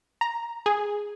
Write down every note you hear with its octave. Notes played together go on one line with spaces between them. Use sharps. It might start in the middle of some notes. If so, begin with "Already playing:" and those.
A#5
G#4